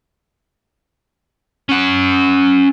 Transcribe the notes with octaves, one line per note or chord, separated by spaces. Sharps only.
C#4 F#5